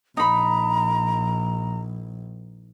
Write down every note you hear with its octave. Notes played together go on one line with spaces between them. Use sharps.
A#1 D#4 A#5 B5